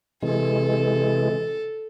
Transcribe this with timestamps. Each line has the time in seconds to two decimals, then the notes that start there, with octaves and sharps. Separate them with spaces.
0.22 C3 E3 G#3 A4